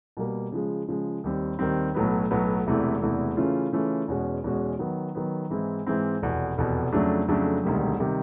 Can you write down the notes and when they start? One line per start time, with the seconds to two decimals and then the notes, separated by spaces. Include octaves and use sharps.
0.17 B2 G3 A#3
0.52 C#3 F3 G#3
0.88 C#3 F3 G#3
1.24 D#2 D#3 G3 C4
1.59 D#2 D#3 G3 C4
1.94 B1 A2 F#3 B3
2.31 B1 A2 F#3 B3
2.67 E1 E2 C3 E3 A3
3.02 E1 E2 C3 E3 A3
3.37 C#3 E3 A3 C#4 F4
3.73 C#3 E3 A3 C#4 F4
4.08 E2 B2 G#3 C#4 F#4
4.44 E2 B2 G#3 C#4 F#4
4.79 D#3 F#3 B3
5.15 D#3 F#3 B3
5.50 G#2 E3 G#3 C4 E4
5.86 G#2 E3 G#3 C4 E4
6.22 F1 E2 B2
6.58 F1 E2 B2
6.93 F2 C#3 F#3 A3 D4
7.28 F2 C#3 F#3 A3 D4
7.64 E1 D2 C3 D#3 G3
8.00 C3 D#3 G3